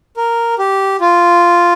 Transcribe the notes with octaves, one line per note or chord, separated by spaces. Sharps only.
A#4
G4
F4